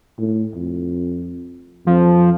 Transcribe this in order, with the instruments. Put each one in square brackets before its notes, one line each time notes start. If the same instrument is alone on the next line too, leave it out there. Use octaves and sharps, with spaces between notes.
[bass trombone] A2
F2
[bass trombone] F2 [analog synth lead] F3